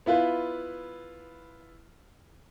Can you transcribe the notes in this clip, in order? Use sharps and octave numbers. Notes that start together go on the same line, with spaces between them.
B3 E4 F4 B4